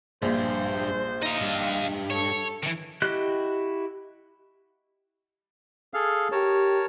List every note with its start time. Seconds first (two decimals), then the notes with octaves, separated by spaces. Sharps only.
0.22 A#1 G2 C5
1.22 D#4 D#5 F5
1.41 G2
2.10 A4 C#5
2.63 D#3 E3
3.02 E4 F#4 G4 D#5 F#6
5.94 G#4 A4 F5
6.32 G4 A#4 C#5 A5